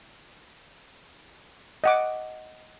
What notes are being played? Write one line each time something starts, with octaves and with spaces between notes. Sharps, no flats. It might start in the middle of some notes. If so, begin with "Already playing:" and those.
D#5 F#5 D6